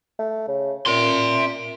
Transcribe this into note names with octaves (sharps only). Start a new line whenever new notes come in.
A3
C#3
A#2 E5 C6